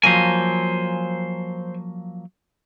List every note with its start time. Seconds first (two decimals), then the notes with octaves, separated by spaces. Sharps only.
0.03 F3 F#3 A#3 C5 G#5